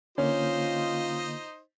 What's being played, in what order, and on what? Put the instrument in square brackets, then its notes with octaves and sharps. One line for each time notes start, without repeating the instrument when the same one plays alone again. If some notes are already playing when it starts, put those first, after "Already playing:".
[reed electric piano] D3 A#3 [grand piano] C#4 [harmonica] D#4 C5 D#5 [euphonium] F4